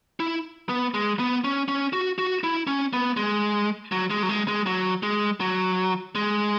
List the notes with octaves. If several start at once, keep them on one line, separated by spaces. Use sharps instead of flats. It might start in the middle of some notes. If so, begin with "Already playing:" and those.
E4
B3
G#3
B3
C#4
C#4
F#4
F#4
E4
C#4
B3
G#3
F#3
G#3
F#3
G#3
G#3
F#3
G#3
F#3
G#3